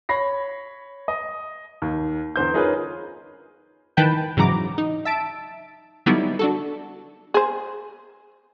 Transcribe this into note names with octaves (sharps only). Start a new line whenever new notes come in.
C#5 B5 A#6 C7
D#5
D#2
E2 D3 C5 G6
C#4 D#4 F4 G#4 A#4 B4
D#3 E3 B4 G5 A5 G6
G#2 C#3 E3 F#3 A#5 D6
D#4
E5 A5 D7
D3 F#3 G3 B3 D#4 E4
D4 F#4 A4
G#4 C5